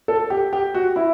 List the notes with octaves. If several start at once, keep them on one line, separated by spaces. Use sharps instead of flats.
A4
G4
G4
F#4
E4